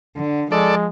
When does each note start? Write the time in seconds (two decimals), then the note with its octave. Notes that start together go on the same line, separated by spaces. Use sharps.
0.16 D3
0.52 F3 G#3 A4 D5